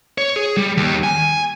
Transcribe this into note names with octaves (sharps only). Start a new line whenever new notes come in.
C#5
G#4
G3
D#2
G#5